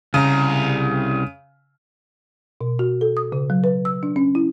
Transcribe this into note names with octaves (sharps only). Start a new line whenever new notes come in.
C2 C#3 A#5
B2
F#4
A4
D#6
C#3
F#3
B4
E6
D4
C#4
E4